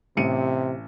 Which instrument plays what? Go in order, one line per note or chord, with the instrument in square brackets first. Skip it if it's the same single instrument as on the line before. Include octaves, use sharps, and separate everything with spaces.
[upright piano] A1 C#7 D#7 [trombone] C3